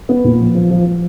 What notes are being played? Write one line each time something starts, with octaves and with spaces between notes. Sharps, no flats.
B3
A#2
F3
F3
F3
F3